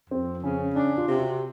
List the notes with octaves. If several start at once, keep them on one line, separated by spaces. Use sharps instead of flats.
F2 C4
C#3 C#4
C#4 D4
F4
C3
F#4